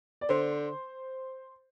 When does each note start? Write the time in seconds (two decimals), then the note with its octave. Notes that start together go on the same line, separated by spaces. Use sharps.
0.21 D5
0.29 D3 C5